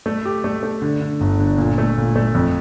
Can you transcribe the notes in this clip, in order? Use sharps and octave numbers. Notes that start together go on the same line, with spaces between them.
A3
G4
A3
A3
D3
D3
G1
D3
A#2
A3
A#2
A3
F2